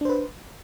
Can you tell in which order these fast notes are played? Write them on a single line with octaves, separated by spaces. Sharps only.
D4 C5 B4